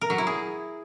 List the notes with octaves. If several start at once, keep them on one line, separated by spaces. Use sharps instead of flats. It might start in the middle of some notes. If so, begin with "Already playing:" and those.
A#4
F#3
E4
G#4